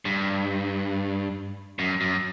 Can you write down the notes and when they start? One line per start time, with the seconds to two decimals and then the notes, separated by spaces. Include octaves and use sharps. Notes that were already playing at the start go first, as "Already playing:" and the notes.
0.05 G2
1.79 F#2
2.01 F#2